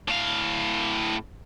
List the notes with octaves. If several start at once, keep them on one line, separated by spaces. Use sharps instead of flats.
A2 F5